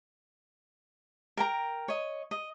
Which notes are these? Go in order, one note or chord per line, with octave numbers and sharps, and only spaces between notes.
A#4 G5 A#5
C#5 D#5
D#5